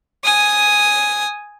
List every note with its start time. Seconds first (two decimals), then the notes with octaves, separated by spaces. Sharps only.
0.25 G#5 D#6